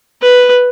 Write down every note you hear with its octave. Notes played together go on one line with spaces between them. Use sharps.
B4